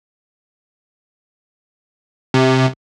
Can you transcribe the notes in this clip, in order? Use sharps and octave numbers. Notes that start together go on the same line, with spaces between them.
C3